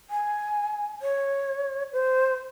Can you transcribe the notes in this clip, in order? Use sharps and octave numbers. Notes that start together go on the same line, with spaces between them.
G#5
C#5
C5